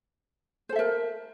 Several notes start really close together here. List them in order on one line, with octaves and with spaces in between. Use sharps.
C5 A4 E5 A#4